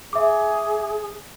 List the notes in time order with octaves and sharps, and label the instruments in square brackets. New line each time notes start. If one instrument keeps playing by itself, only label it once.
[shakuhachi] G#4 [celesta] E5 D6